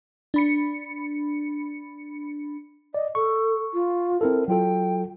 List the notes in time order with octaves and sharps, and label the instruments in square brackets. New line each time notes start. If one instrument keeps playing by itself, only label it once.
[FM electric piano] D4 B5 C#7
[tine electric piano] D5 [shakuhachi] D#5
[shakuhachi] A4 [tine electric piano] C#6
[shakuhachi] F4
[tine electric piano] C4 E4 A4 [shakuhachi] A#4
[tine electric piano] F#3 F4 A4 [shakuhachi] G5